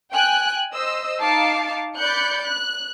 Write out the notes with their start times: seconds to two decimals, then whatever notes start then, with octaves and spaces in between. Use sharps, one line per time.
0.13 G5 G#5 F#6
0.73 C5 D#5 E6
1.21 D#4 F5 A5 D6 C7
1.97 D5 B5 F#6 G6 C#7
2.43 F#6